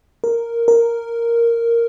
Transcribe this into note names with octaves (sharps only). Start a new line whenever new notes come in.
A#4
A#4